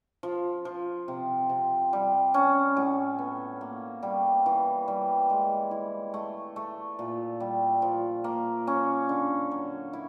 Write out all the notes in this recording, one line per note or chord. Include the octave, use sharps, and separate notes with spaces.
F3
F3
C3
C3
G3
C#4
A2
B3
A#3
G3
E3
G3
G#3
E4
A3
A3
A#2
G3
F3
A#3
C#4
D3
F#3
E4